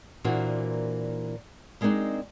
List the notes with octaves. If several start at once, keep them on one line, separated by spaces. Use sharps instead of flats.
A#2 E3 A#3 D4 F#4 C5
G3 G#3 A#3 C4 D4 D#4